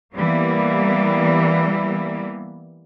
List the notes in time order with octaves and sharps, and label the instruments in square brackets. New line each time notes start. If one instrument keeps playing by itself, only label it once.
[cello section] E3 G3 A#3 B3